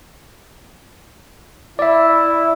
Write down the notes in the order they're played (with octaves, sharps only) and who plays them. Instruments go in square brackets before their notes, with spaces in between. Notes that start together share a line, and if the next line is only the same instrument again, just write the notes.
[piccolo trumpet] E4 [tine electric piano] D5 E5